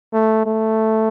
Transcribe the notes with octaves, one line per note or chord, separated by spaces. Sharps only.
A3
A3